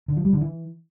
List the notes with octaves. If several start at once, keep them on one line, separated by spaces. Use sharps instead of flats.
D3
F3
G3
D3
E3